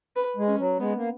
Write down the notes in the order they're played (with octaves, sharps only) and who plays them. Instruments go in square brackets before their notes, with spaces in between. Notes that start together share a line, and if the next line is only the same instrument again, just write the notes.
[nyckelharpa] B4
[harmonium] G#3
[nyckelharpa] C#4
[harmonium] F#3
[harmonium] G#3 [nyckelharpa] B3
[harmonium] A#3